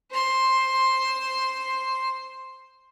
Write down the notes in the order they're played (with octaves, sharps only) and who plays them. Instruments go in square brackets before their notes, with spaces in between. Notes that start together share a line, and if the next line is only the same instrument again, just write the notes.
[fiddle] C5 C6